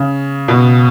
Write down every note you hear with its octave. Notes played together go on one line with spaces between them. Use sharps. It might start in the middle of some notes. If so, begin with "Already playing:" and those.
Already playing: C#3
B2